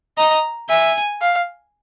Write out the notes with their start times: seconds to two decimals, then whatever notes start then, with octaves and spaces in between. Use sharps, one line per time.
0.18 D#5 A#5
0.69 E5 G#5
1.22 F5